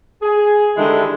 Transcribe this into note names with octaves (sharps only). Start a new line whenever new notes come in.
G#4
D3 D#3 G3 G#3 E4